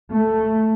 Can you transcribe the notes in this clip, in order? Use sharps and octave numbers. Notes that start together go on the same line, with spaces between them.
A3